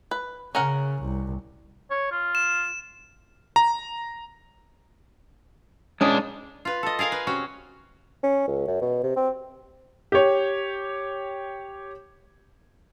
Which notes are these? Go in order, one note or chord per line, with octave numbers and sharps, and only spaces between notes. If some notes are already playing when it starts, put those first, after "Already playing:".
B4
C#3 C#4 A#4 F#5
C2
C#5
F4
E7
A#5
G#3 C#4 D4 D#6
F4 B4
A4 D#5
G#4 A#4 F5 G#5
B4
C3 C#4 F#4
C#4
C#2
F#2
B2
C3
C4
G4 C#5